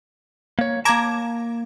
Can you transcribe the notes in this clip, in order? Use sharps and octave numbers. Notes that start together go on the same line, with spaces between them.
A#3 C#5
A#3 A5 A#5 D6 G#6